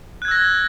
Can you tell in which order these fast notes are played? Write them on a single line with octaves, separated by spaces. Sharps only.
F#6 G#6 E6 A#6